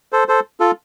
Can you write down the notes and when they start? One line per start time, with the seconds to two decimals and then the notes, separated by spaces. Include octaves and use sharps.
0.13 A4 C5
0.28 A4 C5
0.60 F4 A4